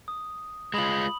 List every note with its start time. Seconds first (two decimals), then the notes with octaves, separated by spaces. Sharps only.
0.08 D#6
0.74 G#3 F4 B5 D#6 F#7